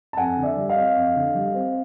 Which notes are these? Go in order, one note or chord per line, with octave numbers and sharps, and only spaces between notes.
A5
F2 F#5 G#5
D3
D5 E5
G3
D#5 F5
C4
F2
D3
G3
C4